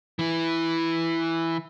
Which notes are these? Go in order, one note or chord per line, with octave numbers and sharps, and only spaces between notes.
E3 E4